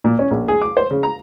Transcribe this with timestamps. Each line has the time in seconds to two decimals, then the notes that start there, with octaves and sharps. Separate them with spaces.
0.04 A#2
0.19 C#4
0.31 A#1
0.48 G#4
0.62 D6
0.77 C5
0.91 C#3
1.03 A#5